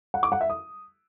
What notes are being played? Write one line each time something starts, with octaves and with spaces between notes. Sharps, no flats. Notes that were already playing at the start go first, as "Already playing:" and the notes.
F#5
D6
F#5
E5
D#6